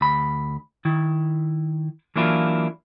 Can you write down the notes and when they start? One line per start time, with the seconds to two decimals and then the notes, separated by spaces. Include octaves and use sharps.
0.01 D2 B5
0.85 D#3 E4
2.16 E3 F#3 A#3 D4 E4 F4